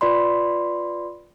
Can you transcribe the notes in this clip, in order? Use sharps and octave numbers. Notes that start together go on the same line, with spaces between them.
F4 B4 D5 B5 C6